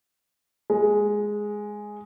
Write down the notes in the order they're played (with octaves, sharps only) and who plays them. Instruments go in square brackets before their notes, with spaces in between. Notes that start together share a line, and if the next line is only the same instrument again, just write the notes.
[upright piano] G#3